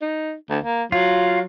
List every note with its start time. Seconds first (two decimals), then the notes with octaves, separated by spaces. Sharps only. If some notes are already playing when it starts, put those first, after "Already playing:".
0.02 D#4
0.50 D2
0.64 A#3
0.92 F#3 F4